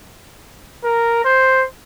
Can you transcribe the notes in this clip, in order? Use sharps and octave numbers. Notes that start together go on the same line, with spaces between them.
A#4
C5